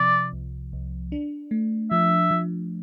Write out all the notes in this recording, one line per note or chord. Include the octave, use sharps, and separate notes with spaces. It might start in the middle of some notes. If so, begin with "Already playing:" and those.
Already playing: C3 F3 D5
C2
C2
D4
A3
F3 E5
F3